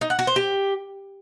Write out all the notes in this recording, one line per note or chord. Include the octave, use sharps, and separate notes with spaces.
D#4
F#5
F#4
C5
G4